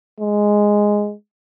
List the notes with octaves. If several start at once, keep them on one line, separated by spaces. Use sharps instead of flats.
G#3